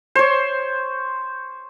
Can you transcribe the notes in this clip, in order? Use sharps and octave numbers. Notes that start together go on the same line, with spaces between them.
C5 C#5